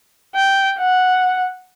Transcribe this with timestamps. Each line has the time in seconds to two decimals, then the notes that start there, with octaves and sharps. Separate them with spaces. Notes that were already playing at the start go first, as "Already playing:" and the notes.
0.35 G5
0.79 F#5